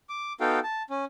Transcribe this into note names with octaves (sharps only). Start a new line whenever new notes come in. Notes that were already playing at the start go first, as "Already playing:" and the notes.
D6
B3 D#4 F#4 A4 F5 G5
A5
C#4